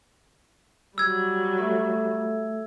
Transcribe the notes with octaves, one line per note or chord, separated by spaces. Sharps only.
F#3 G3 E6 G#6
A3 A4 E5